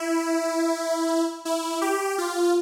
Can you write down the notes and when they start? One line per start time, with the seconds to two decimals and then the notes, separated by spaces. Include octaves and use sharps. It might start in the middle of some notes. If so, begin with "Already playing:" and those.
Already playing: E4
1.45 E4
1.81 G4
2.18 F4